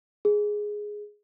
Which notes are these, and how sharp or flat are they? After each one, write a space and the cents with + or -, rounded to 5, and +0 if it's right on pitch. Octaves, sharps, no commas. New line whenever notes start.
G#4 +5